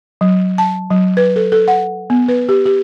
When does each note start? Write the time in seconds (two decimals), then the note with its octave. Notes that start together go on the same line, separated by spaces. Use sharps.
0.21 F#3
0.58 A5
0.90 F#3
1.17 B4
1.36 A4
1.52 A4
1.68 F#5
2.10 B3
2.28 B4
2.49 G4
2.66 G4